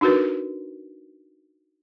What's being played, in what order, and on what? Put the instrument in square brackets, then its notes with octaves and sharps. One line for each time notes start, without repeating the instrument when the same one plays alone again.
[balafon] D4 D#4 F#4 A#4 B4